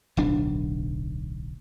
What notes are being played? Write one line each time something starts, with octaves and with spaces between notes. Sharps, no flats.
D1 B1 D4